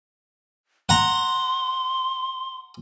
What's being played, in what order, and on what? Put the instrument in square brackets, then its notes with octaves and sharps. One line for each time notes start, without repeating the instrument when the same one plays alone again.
[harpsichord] F#5 A#5 [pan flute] C6